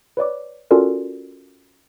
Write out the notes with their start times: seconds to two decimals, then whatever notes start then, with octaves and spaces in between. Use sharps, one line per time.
0.17 B4 C#5 D5 D6
0.71 C#4 F4 F#4 A4 A#4 D5